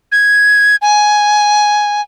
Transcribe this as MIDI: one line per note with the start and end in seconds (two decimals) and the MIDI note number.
0.12 0.76 92
0.82 2.01 80